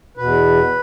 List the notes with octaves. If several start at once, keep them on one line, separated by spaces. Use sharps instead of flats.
E2 B2 B4